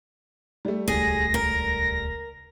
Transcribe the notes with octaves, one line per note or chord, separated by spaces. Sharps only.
G3 A3
D#1 C#2 G#4 A#6
A#4